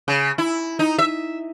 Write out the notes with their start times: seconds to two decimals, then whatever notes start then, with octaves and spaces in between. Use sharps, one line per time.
0.08 C#3
0.38 E4
0.79 D#4
0.98 E5